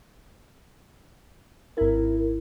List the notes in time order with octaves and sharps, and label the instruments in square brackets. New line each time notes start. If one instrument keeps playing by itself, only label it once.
[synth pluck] G#1 E4 [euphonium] A#4